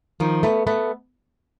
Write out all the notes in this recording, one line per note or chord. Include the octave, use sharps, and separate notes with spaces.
D#3 F3
A3 B3
A3 B3